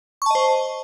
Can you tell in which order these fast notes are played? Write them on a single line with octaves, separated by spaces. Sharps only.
C#6 A5 D#5 C5